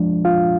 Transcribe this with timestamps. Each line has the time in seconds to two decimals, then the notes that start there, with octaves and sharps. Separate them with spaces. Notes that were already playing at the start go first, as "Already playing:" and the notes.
Already playing: F3 G#3 D4
0.25 F4 F5